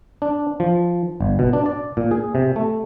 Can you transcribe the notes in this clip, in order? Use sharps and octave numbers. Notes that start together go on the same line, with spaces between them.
D4
F3
G1
B2
D4
D5
A#2
G#4
C3
A3